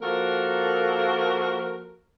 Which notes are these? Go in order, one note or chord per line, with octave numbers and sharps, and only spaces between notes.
F3 A#3 F#4 A4 A#4